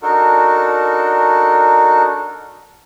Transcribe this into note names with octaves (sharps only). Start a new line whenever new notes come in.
D4 D#4 F#4 A4 A#4